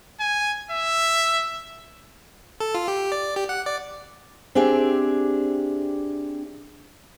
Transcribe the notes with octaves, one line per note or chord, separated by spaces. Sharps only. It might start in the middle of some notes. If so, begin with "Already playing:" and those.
G#5
E5
A4
F4
G4
D5
G4
F#5
D5
C4 D4 G4 G#4 E5